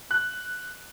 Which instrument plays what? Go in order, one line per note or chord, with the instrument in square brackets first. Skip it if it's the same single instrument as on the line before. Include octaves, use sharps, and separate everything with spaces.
[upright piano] F#6